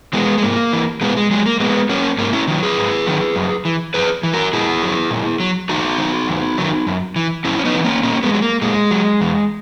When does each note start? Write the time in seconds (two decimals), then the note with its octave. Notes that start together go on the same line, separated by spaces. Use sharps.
0.13 E3 G#3 B3
0.38 G#3
0.43 G#2 A#3
0.73 E3
1.01 A#2 G#3 B3
1.16 G#3
1.31 F#3 G#3
1.46 A#3
1.60 A#2 G#3 B3
1.89 F#3 A#3 C#4
2.18 G#2 A#3 C#4
2.33 C#4 E4
2.48 D#3 F#3
2.63 G#4 B4
2.78 G#2
3.06 D#3 F#3
3.36 F#2
3.65 E3
3.94 F#2 G#4 B4
4.23 E3
4.33 F#4 A#4
4.53 A#2 E4 G#4
4.82 F#3
5.11 A#2
5.40 F#3
5.69 E2 D#4 F#4
5.98 D#3 F#3
6.28 E2
6.58 D#3 F#3
6.87 F#2
7.16 E3
7.45 F#2 C#4 E4
7.59 C#4
7.65 B3 D#4
7.74 E3
7.84 A#3 C#4
8.03 A#2 A#3 C#4
8.23 G#3 B3
8.33 F#3
8.42 A#3
8.62 A#2 G#3
8.91 F#3
9.21 E2